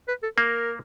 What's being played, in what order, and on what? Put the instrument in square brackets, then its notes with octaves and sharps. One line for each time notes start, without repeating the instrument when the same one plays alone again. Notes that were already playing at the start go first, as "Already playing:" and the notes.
[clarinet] B4
A4
[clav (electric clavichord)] A#3 [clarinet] A#4